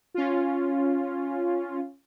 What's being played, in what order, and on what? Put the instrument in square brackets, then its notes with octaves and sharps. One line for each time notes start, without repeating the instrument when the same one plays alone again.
[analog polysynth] C#4 F4